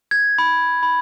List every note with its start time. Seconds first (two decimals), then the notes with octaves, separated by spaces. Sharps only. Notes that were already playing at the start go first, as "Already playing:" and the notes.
0.11 G#6
0.38 B5
0.83 B5